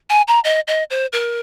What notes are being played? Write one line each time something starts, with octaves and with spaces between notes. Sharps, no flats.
G#5
A#5
D#5
D#5
C5
A#4